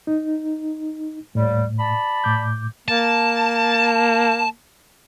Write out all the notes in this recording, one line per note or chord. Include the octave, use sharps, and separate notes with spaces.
D#4
D#2 A2 G3
D5 A5 B5
A2 D6 G6
A#3 A5